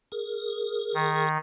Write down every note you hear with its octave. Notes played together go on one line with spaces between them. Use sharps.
G#4 A#4
D#3